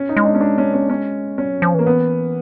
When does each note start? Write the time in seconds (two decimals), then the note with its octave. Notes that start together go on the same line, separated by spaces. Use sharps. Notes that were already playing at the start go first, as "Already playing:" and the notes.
Already playing: C#4
0.09 D#4
0.17 G#3
0.25 D4
0.35 C#4
0.41 D4
0.58 C#4
0.74 C#4
0.90 C#4
1.38 G3 C#4
1.50 F#3
1.62 F3
1.75 E3 A#3
1.86 B3